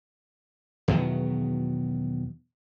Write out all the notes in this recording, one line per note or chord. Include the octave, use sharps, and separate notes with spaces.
E2 B2 D#3 F#3